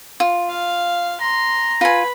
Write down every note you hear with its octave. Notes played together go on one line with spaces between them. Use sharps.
F4
F5
A#5 C6
F4 B4 G#5 B5